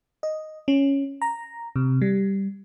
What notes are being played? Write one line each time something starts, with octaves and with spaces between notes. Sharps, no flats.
D#5
C#4
A#5
C3
G3